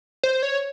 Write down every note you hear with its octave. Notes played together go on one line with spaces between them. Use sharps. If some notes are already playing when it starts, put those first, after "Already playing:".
C5
C#5